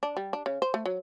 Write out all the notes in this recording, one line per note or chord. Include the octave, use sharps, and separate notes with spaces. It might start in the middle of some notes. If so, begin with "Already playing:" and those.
D4
G3
D4
C#3
C5
A3
F#3